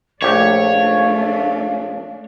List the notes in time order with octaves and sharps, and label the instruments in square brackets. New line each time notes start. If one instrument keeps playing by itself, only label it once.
[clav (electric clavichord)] A#1 G4 [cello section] A3 D4 [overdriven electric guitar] C#5 [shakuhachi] F5